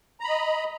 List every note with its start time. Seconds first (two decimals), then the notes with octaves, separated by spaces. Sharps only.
0.20 A#5
0.24 B5
0.28 D#5